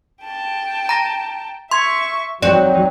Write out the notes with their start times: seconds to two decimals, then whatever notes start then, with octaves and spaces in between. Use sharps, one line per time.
0.24 G5 A5
0.89 A#5 A#6
1.71 E5 C6 C#6 G#6
2.42 F#3 C4 D#4 F#4 D5